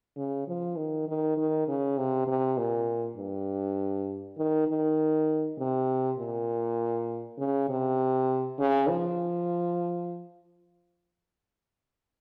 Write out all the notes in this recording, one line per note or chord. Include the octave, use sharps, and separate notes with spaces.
C#3
F3
D#3
D#3
D#3
C#3
C3
C3
A#2
G2
D#3
D#3
C3
A#2
C#3
C3
C#3
F3